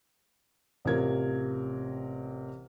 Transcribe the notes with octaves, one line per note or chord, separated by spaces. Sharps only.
A1 C3 F4 A#4 G#6